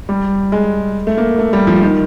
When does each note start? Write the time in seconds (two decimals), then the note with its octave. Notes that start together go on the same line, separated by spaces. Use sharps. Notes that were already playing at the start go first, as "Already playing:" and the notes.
0.09 G3
0.52 G#3
1.07 A3
1.17 A#3
1.39 A3
1.53 G3
1.67 F3
1.82 D#3